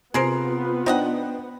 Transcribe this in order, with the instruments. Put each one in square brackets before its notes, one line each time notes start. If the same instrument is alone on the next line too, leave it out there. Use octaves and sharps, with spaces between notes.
[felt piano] C3 C7 [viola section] B3 [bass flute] F4 [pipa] G#4 A#4 C5
[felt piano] D4 C5 G5 [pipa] D#4 D#5 F#5